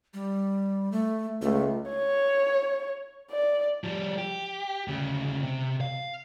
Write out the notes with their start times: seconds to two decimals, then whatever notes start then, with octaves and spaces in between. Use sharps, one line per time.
0.14 G3
0.92 A3
1.42 C#2 A3
1.89 C#5
3.30 D5
3.84 F3 G3
4.18 G4
4.88 D2 C#3
5.43 C3
5.81 F5